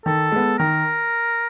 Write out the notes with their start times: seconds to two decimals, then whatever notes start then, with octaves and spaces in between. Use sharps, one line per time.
0.06 D#3 A4
0.32 G#3 B3
0.58 D#3 A#4